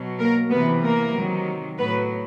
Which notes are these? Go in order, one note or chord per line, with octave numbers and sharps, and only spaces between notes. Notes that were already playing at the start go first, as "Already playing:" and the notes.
Already playing: B2 F#3
A#3 A#4
C3 E3 B3 B4
A#3 A#4
C3 D#3 F#3
A2 F#3 B3 B4